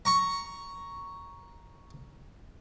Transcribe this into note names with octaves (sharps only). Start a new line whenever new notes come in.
A#5 C#6